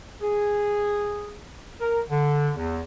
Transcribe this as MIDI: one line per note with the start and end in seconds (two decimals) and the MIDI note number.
0.22 1.37 68
1.81 2.00 70
2.11 2.50 50
2.55 2.80 40